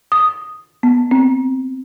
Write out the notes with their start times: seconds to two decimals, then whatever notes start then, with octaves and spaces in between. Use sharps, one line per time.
0.12 D#6
0.83 B3
1.11 C4